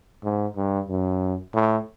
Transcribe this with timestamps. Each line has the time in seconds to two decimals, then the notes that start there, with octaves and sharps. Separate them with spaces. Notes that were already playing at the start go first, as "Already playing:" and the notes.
0.24 G#2
0.57 G2
0.89 F#2
1.54 A2